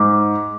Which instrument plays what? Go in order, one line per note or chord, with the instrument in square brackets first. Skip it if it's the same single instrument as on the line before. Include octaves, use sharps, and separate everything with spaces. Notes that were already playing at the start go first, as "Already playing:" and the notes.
Already playing: [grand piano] G#2 [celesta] D6